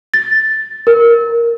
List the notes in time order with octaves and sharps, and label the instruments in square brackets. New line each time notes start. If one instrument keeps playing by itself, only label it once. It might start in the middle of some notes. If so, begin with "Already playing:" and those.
[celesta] A6
A#4